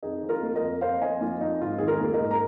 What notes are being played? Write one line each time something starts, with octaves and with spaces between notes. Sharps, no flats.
F2 D#4 G#4
F3
F4 A#4
A#3
A#4 D#5
F2
F2 C5 F5
F3 D#5 G#5
A#3 F4
F2 D#4
G#2 F4
D#3 G#4
F4 A#4
A#3
A#4 D#5
G#2
A#5